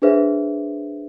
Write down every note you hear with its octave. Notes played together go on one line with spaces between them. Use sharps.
D4 G#4 B4 C5 E5